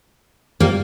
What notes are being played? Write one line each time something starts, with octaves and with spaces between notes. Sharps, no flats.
G3 A#3